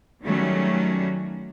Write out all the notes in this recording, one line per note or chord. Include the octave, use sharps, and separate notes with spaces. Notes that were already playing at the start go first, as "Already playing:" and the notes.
D#3 F#3 G3 A3 C#4